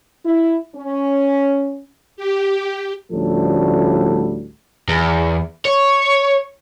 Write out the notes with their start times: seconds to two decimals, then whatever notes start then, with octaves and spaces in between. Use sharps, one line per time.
0.25 E4
0.76 C#4
2.16 G4
3.12 D2 A2 F3 G3 C#4 A4
4.89 E2
5.65 C#5